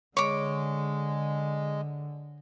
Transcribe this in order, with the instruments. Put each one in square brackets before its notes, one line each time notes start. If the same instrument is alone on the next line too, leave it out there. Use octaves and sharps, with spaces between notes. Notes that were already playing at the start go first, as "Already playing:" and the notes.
[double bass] D3 [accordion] G#3 [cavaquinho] C#5 D6